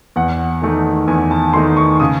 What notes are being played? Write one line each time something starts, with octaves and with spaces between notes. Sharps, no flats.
E2 F#5
D#3 A3 D#4
E2 G#5
A5
D#3 A3 D#4 C6
C#6
C#3 D#6